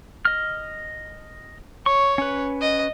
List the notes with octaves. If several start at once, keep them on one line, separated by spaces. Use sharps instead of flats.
D#5 F6
C#5 C#6
C#4 B4
D#5